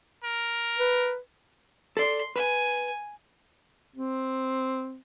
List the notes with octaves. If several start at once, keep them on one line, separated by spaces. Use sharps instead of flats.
A#4
B4
A4 D5 C6
B4 G#5
C4